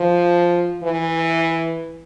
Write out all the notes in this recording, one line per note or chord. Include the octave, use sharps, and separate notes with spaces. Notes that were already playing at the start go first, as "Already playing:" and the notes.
Already playing: F3
E3